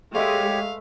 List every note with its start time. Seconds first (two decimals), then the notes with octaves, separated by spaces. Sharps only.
0.14 G#3 A3 G4 B4 C#5 E5 F5